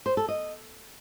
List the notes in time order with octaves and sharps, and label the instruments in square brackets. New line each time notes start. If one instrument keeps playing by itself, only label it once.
[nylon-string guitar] C5
A4
D#5